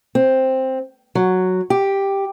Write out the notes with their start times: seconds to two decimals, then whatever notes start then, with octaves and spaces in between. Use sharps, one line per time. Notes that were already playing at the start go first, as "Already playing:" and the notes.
0.15 C4
1.15 F#3
1.70 G4